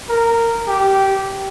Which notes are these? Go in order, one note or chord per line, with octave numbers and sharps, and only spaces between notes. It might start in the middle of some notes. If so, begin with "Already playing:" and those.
A#4
G4